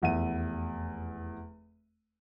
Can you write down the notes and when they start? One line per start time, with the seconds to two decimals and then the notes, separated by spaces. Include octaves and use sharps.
0.02 F1 E2 E5 F#5 D#7